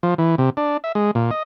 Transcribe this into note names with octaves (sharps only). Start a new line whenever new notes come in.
F3
E3
C3
D4
E5
G#3
A#2
D#5